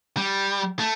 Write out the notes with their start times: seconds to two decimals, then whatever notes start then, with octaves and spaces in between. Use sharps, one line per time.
0.17 G3
0.79 A3